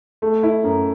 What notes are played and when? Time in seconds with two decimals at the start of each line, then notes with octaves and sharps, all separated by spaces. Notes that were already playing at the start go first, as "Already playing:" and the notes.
0.22 A3
0.43 E4
0.64 F#2